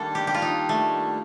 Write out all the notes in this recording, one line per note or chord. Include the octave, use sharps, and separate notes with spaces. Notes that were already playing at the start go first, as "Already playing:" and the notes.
Already playing: D#3 G3 A#3 D4 A4
G4
G4
F4
D#4
A3